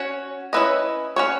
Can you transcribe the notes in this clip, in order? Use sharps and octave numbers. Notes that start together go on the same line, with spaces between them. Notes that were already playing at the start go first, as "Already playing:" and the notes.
Already playing: C#4 F#4 C#5
C#4 E4 B4 D#5
C#4 F#4 C#5